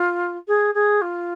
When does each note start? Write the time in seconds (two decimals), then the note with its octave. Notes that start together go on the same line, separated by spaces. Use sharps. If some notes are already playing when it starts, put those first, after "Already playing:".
Already playing: F4
0.47 G#4
0.74 G#4
1.01 F4